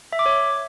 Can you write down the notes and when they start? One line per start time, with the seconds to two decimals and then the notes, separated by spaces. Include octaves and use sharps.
0.13 E5
0.19 D6
0.26 C#5